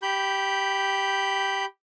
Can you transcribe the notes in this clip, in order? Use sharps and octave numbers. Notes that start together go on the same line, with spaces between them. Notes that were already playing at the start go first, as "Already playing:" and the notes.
G4 B5 G6